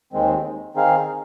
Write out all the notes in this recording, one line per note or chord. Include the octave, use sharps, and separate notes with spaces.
D#2 D#3 G#3 C4
D#3 C4 D#4 G#4 F5